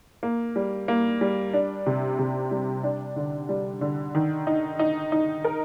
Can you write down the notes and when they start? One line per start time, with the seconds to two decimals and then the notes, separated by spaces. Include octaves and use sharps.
0.23 A#3
0.56 G3
0.88 A#3
1.21 G3
1.53 D4
1.86 C3
2.19 C3
2.51 G3
2.84 D4
3.16 D3
3.49 G3
3.81 D3
4.15 D#3
4.47 D#4
4.79 D#4
5.12 D#4
5.44 A#4